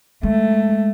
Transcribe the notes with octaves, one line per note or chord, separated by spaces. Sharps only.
G#3 A3